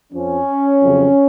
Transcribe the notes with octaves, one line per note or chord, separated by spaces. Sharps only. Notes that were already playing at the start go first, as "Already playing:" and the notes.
F2 F3 C#4
F2 C#3 F#3